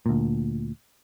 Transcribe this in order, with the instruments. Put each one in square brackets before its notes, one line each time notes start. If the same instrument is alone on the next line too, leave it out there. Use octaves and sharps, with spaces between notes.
[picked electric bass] D2 A#2